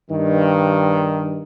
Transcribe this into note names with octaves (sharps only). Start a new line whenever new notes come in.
G2 D#3